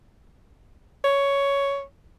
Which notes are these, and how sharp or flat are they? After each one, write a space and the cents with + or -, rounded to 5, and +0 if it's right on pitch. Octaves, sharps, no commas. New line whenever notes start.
C#5 +10